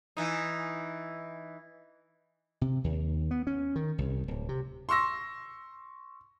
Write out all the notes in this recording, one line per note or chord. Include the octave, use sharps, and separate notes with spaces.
E3 D#4
C3
D#2
B3
C#4
D#3
C2
D1
C3
C6 C#6 E6 A#6